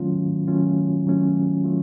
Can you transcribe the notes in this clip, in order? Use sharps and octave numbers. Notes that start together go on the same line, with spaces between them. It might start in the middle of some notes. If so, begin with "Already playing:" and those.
Already playing: D#3 F#3 A3 C#4 F4
D#3 F#3 A3 C#4 F4
D#3 F#3 A3 C#4 F4
D#3 F#3 A3 C#4 F4